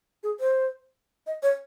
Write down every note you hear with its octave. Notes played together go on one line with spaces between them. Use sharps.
G#4
C5
D#5
C#5